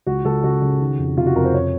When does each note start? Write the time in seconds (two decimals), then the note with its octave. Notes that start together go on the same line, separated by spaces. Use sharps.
0.06 C#2 F#4
0.25 C#2 A4
0.44 C#3 F#4
0.62 C#3
0.80 D#3
0.99 F2
1.17 C3 F4
1.26 F#4
1.36 F2 A#4
1.45 C5
1.54 F2 C#5